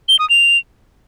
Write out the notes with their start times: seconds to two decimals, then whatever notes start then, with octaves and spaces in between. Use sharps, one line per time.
0.09 G7
0.19 D#6
0.30 F7